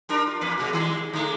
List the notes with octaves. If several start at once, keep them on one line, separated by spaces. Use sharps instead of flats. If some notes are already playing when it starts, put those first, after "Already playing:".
G3 D4 A#4
F4
E2 A#3 B4
B2 G#3 F#4
D#3 G3 G#3
D3 G#3 A3